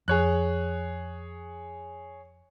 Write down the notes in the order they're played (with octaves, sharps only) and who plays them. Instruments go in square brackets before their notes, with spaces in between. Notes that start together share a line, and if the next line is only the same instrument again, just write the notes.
[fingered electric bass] F2 [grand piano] G#4 C#5 F#6